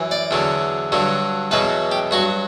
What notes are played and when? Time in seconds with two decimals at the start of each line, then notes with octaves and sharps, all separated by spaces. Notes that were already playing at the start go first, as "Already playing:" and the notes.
Already playing: F#2 E3
0.11 D5
0.31 E2 D3 F#3
0.92 G2 D3 F#3
1.51 E2 B2 F#3 B4
1.91 G4
2.11 G2 F#3 F#4